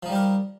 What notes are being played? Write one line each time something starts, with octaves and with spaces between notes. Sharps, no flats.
F3 G3 D#4 G4 A#4